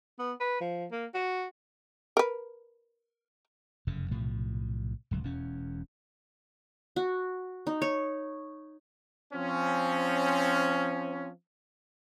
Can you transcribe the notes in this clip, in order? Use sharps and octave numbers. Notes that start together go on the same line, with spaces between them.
B3
B4
F3
A#3
F#4
A#4 B4
F1 F#2 C#3
B1 A2 C3 F3
D1 C#2 F#3
E1 E2 C#4
F#4
D#4
C#5
F3 C4 C#4